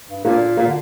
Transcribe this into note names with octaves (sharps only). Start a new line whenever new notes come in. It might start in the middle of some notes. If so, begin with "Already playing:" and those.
G2
A#2 A#3 D4
A#2 A#3
D3